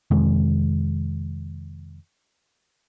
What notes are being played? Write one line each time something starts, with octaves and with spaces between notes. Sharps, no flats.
F2 C3 D#3 G#3